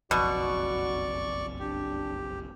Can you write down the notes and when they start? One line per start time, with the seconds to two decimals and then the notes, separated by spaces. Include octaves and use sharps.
0.11 F#1 B1 F2 B2 F#4 D5 C#6
1.59 D4 G4